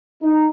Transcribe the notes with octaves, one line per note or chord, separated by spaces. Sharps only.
D#4